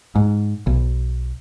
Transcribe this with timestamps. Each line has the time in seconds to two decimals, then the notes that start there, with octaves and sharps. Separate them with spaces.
0.15 G#2
0.67 B1